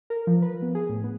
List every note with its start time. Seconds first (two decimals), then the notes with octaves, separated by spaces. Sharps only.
0.10 A#4
0.27 F3
0.42 B4
0.62 B3
0.75 G#4
0.89 A2
1.04 B3